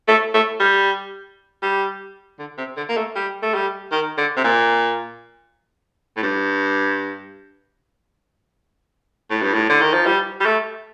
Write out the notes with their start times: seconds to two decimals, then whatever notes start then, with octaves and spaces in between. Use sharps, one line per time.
0.08 A3
0.34 A3
0.60 G3
1.62 G3
2.39 D3
2.58 C3
2.77 D3
2.89 A#3
2.97 A3
3.16 G3
3.42 A3
3.55 G3
3.92 D#3
4.18 D3
4.37 C3
4.44 A#2
6.17 A2
6.23 G2
9.31 A2
9.43 G2
9.54 A2
9.69 D3
9.81 D#3
9.94 F3
10.06 G3
10.41 G3
10.46 A3